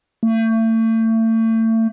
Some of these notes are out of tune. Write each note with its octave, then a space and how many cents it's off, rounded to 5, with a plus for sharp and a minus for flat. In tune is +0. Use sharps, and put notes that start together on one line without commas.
A3 +35